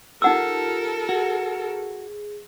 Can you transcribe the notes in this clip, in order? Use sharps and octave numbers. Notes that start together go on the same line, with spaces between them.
D#4 F4 G4 A4 A#4 F#5 A5 E6
F#4 G#4